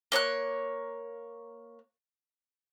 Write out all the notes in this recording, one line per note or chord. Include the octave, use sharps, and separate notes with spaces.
A#3 C#5 A5 F#6